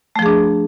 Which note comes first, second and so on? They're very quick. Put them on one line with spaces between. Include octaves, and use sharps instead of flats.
A3 F3 G#4 D4